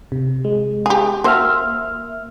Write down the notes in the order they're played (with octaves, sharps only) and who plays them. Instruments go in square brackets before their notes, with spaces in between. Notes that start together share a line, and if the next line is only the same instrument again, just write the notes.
[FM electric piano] C3
G#3
[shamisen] G4 G#4
[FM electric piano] A#3 E5 F6 [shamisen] F#4 C5